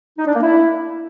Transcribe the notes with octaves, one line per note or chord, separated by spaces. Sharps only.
D#4
D4
A#3
E4